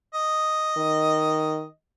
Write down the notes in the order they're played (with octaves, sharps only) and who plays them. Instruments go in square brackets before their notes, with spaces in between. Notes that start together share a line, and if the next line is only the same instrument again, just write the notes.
[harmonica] D#5
[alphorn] D#3